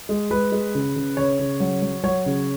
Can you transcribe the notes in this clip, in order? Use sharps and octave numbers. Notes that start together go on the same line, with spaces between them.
G#3
G#3 B4
G#3
C#3
C#3
C#3 C#5
C#3
F#3
F#3
F#3 C#5
C#3